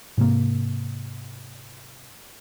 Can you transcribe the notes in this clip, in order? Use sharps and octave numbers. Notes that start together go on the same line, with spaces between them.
G#2 C3 A#3